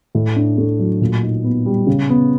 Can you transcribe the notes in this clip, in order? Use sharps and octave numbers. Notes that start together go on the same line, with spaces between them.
A2
D4
A3
F#3
A#2
D#4
B3
G3
C#3
B3